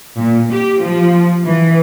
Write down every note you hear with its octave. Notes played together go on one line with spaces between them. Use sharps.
A#2
G4
F3
E3